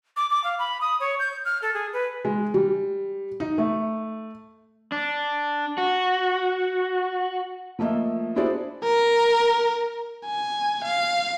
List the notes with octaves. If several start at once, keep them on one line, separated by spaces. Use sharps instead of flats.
D6
D6
F5
B5
D#6
C#5
G6
F6
A4
G#4
B4
G#3
G3
D#4
A3
D4
F#4
F3 A3 A#3 D#5 E5
D4 E4 F#4 G#4 C5 D5
A#4
G#5
F5